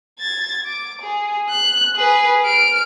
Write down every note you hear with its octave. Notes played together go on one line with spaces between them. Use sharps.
G#6 A6
D6
G#4
F#6
G#4 B4
F6 D7